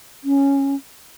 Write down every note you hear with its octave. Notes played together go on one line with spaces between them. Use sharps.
C#4